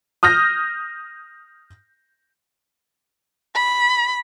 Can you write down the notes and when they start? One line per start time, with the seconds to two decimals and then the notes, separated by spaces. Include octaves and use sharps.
0.23 D#6 F6 G6 A#6
3.55 B5